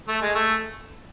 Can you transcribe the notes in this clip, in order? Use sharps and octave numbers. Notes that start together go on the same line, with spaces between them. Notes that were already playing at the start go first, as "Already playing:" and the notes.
A3
G#3
A3